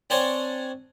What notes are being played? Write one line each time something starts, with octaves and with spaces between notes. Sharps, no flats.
C4 D4 C5 C#5 G#5 A5